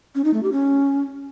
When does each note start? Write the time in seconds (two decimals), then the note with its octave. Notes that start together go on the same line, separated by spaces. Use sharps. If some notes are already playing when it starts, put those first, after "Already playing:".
0.15 C#4
0.24 D#4
0.34 A3
0.43 G4
0.52 C#4